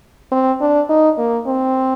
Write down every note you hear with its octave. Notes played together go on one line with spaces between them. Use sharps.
C4
D4
D#4
A#3
C4